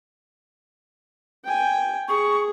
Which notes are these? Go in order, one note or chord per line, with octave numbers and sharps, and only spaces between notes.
G5 G#5
G#4 C#6